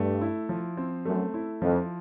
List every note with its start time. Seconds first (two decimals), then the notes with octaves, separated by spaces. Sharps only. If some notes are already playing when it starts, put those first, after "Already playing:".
Already playing: G2 A3
0.21 E4
0.49 F3
0.77 C4
1.06 F#2 A3
1.34 E4
1.62 F2 F3